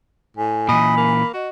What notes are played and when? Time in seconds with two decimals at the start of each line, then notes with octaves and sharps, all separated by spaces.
0.36 A2 G#5
0.69 A#2 E3 D#5 B5
0.97 A#3
1.34 F#4 D#5